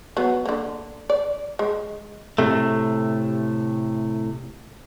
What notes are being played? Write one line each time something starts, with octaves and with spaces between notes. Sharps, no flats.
F#3 B3
D3 A#3
D5
G#3
A2 C3 A3